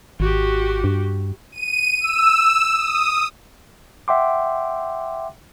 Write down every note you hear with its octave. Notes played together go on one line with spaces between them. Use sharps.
G#1 F#4 G4
G2
D#7
E6
D#6
E5 F#5 G5 C6 D6